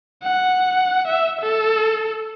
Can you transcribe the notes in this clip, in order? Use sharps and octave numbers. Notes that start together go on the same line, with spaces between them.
F#5
E5
A4